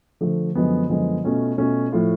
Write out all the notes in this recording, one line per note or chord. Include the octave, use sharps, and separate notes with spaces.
D3 F3 A3
F#2 D3 F3 G#3 B3
F#2 D3 F3 G#3 B3
B2 A3 C#4 F4
B2 A3 C#4 F4
A2 F3 A3 F4